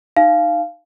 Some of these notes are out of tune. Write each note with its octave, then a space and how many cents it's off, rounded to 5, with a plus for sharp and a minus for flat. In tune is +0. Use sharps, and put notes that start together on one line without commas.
D#4 -10 F5 -10 G#5 +40